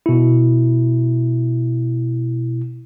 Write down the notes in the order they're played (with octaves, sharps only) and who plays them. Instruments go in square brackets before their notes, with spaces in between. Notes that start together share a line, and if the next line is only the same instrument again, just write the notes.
[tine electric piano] B2 E4